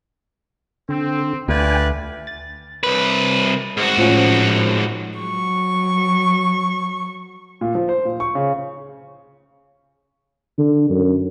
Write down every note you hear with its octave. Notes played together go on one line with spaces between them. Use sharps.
D3 C4
D2 F4 B4 D5 G5 G#5
A6
C2 B4
G#2 F#4
A2 F3 C#4
F#3 C#6
A#2
F3
C5
A#2
C#6
C#3
D3
F#2